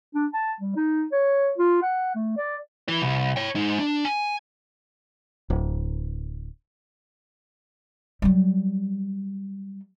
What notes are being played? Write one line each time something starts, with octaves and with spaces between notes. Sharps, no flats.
D4
A5
G3
D#4
C#5
F4
F#5
A3
D5
E4 B4
C2
C#5 G5
G#3 D#4
D4
G#5
D1
F#3 G3